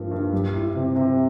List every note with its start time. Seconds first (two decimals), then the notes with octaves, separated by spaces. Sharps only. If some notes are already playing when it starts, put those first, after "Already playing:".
Already playing: G2 F3 A#3
0.11 G2
0.32 G3
0.54 E4
0.75 C3
0.96 C3